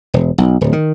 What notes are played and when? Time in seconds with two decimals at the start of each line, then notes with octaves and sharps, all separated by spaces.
0.14 E1
0.38 B1
0.61 D1
0.73 D#3